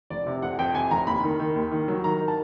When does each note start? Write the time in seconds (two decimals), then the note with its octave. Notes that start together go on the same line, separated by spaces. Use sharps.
0.10 F1 D5
0.27 C3
0.42 F2 F#5
0.59 F2 G5
0.75 C3 G#5
0.91 F1 A#5
1.07 D#2 B5
1.23 D#3
1.40 D#3
1.56 D#2
1.71 D#3
1.88 F#3
2.04 D#3 A#5
2.20 D#3
2.28 A5